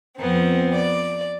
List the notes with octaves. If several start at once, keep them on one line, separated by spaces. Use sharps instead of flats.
F2 B3 C4
D5